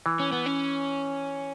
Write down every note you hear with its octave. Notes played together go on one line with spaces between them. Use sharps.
E3
C#4
B3
C#4